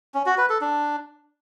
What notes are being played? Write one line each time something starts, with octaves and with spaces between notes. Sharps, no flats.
C#4
F#4
B4
A4
D4